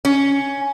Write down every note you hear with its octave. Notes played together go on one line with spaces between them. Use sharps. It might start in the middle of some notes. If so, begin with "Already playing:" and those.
C#4